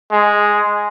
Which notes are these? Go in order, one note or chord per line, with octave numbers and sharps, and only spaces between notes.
G#3